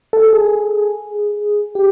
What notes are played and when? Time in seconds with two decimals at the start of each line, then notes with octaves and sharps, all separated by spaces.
0.13 A4
0.33 G#4
1.75 G4